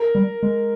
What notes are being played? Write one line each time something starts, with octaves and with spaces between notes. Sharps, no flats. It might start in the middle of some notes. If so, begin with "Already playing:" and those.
Already playing: A#4
G3
G#3